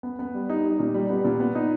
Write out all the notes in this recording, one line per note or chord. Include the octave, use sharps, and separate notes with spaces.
B3
B3
G3
D#4
G3
A#2
G3
B3
A#2
B3
D#4